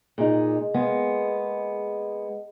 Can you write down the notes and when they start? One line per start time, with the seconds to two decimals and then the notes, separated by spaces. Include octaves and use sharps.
0.18 A#2 G#3 D#4 G#4 D#5
0.74 G#3 A#3 B3